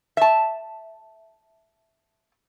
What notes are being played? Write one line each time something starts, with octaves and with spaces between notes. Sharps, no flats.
E5 A5